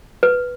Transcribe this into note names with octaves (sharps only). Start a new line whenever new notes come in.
B4